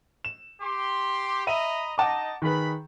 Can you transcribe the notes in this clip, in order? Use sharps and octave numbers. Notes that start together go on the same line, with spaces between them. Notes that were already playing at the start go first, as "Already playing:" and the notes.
E7
G4 C6
D#5 E5 A#5 B5 D#7
D#4 D#5 F#5 A5 D6
D#3 G#4 B4 B5